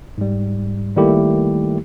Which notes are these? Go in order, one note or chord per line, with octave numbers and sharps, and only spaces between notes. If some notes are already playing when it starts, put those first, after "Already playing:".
G#2 G3
D#3 G3 A3 A#3 E4 G4